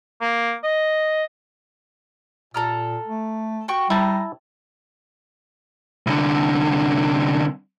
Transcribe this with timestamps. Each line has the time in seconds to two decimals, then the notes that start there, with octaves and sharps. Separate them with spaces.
0.21 A#3
0.64 D#5
2.54 A#2 A4 A#5 F6
3.07 A3
3.68 F#4 G5 C#6
3.90 G3 E4 A5 A#5
6.07 C2 D3